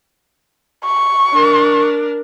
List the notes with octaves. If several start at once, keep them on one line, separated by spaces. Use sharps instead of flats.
C#6
D4 A#4